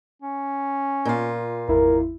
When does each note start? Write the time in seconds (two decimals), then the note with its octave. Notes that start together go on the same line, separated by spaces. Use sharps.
0.22 C#4
1.05 A#2 F4
1.68 G#1 E2 E4 A#4